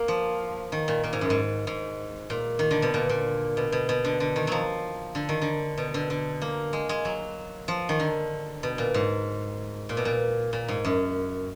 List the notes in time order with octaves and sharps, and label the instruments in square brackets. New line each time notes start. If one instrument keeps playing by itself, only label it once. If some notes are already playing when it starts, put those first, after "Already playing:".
Already playing: [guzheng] A#3
F3
D#3
A#2
A#2
G#2
F#2
G#2
G#2
A#2
D#3
D3
B2
A#2
A#2
B2
B2
B2
D3
D3
D#3
F3 F#3
D3
D#3
D3
B2
D3
D3
A#3
G#3
G#3
F#3
F3
D#3
D3
B2
A#2
G#2
A#2
B2
A#2
A#2
G#2
F#2